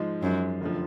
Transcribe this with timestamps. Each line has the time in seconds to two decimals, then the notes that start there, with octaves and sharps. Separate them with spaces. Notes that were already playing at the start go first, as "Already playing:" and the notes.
Already playing: G#2 F3 G#3
0.22 F#2
0.61 F1 D3 F3